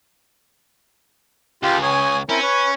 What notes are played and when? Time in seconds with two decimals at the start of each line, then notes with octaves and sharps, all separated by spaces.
1.63 C#2 F4 G4
1.83 C#5 G#5 D#6
2.29 C4 C#4 E4 A#4
2.42 B4 C#5